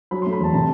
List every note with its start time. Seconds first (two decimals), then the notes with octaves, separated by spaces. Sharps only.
0.11 F#3 B5
0.22 C6
0.26 A3
0.33 B5
0.40 E2 A5
0.54 C3 A5